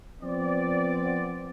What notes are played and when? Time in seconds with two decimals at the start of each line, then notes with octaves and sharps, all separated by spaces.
0.22 F3 B3 C4 D5